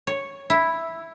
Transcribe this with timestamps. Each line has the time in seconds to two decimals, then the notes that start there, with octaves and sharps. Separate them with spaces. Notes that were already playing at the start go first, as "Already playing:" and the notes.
0.07 C#5
0.50 E4